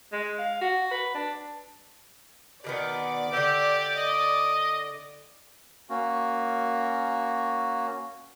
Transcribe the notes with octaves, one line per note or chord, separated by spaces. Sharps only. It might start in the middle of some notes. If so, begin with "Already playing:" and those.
G#3
F5
F#4
B4
D4
B2 D#3 B3 D5 D6
D3 G4 E5
D#5
A#3 C#4 F#4